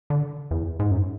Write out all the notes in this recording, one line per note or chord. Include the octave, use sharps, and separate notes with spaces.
D3
E2
G#2
F#2